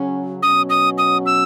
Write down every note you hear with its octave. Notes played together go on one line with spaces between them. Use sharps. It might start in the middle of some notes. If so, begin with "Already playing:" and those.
Already playing: C#3 F#3 C#4
B2 F#3 C#4 D#6
D#6
D#6
E6